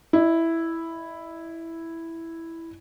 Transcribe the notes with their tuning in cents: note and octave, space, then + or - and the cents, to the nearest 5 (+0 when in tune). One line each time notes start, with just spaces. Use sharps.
E4 +0 D#5 -35